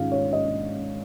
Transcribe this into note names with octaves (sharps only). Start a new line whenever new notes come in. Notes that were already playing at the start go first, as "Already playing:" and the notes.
Already playing: G#2 D#3 G#3 C#4 F4 F5
C#5
D#5